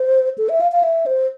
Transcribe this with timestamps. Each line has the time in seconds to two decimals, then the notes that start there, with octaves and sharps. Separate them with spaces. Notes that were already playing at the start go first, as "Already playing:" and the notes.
Already playing: C5
0.38 A4
0.49 E5
0.61 F5
0.72 F5
0.83 E5
1.06 C5